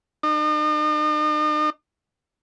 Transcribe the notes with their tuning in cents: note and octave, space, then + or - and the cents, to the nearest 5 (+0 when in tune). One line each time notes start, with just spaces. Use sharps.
D#4 -45